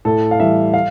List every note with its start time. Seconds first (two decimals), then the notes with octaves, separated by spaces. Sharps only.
0.05 A2 A4
0.31 F5
0.40 E3 G3 E5
0.74 F5